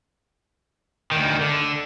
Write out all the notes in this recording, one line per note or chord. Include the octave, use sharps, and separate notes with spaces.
D2 D#3
D3